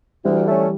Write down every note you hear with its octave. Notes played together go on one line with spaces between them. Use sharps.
D2 E3 G3
D3 A3 C#4